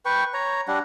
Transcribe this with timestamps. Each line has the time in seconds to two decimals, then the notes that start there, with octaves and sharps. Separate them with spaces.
0.06 B4 G5 C#6
0.34 C#5 A#5
0.68 G3 D4 F#5